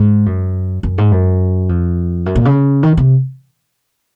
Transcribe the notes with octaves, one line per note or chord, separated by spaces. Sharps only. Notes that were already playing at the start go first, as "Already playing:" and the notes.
Already playing: G#2
F#2
F#2
G#2
F#2
F2
F#2
A#2
C#3
D#3
C3